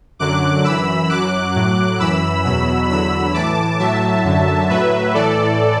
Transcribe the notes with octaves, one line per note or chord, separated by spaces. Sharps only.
F#2 D3 F#3 D6 F#6
F#2 E3 B5 E6
F#2 F#3 D6 F#6
A2 F#3
F#2 E3 B5 E6
E2 B2 F#3 B5 E6
E2 D3 F#3 B5 E6
A2 E3 A5 D6
A2 F#3 E5 A5
F#2 D3 F#3
A2 F#3 B4 E5
A2 E3 A4 D5